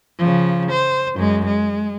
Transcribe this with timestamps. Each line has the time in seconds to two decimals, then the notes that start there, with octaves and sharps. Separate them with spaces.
0.18 C#3 F3
0.71 C5
1.16 F#2 G#3
1.46 G#3